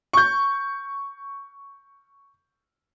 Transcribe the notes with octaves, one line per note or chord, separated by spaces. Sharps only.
C#6 G6